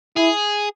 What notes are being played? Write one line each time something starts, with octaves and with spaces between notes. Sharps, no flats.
E4 G#4